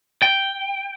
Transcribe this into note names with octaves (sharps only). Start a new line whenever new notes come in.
G5